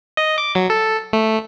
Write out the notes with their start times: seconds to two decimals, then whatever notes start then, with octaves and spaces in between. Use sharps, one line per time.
0.17 D#5
0.38 D6
0.55 F#3
0.70 A4
1.13 A3